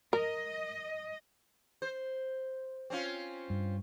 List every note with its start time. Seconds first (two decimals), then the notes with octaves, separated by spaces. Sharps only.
0.13 A#4 D#5
1.82 C5
2.90 C4 C#4 F4
3.50 G2